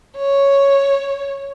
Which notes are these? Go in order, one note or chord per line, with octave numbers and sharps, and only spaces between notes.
C#5